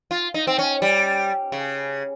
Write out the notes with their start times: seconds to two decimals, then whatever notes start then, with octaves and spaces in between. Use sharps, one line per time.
0.11 F4
0.34 D#4
0.47 C4
0.59 C#4
0.82 G3
1.52 C#3